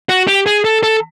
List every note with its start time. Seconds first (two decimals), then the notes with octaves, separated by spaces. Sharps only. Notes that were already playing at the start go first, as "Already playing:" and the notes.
0.09 F#4
0.27 G4
0.46 G#4
0.65 A4
0.83 A4